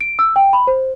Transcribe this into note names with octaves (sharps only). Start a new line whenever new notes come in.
D7
E6
G5
B5
C5